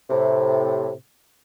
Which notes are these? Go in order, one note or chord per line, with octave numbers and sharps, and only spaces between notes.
A2 C3